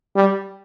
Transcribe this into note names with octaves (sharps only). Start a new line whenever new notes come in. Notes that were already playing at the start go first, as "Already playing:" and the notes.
G3